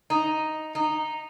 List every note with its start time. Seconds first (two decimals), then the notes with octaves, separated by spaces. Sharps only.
0.10 D#4
0.75 D#4